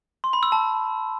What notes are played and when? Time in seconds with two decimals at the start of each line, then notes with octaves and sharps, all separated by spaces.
0.24 C6
0.33 B5
0.43 E6
0.52 A5